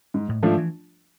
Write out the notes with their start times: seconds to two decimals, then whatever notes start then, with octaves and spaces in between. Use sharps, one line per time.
0.14 G#2
0.28 A2 A3
0.43 G#2 F3 G#3 A3 D4 F4
0.57 E3